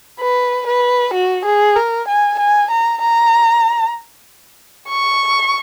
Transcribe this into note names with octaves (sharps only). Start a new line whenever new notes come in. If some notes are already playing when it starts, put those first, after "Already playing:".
B4
B4
F#4
G#4
A#4
G#5
G#5
A#5
A#5
C#6